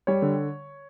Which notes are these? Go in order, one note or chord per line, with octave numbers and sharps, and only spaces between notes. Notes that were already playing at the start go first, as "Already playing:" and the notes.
G3 C#5
D3